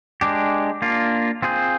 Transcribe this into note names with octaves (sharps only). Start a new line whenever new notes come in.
G#3 D4 G4
A#3 D4 F4
C4 F4 G#4 C5